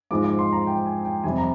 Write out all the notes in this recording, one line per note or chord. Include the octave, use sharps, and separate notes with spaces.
G#2 F3 G#3 D6
D6
C6
A#5
G5
G#5
G5
F2 C3 G3 G#5
A#5